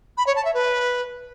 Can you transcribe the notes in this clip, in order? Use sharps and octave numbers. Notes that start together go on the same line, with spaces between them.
B5
C#5
A5
E5
B4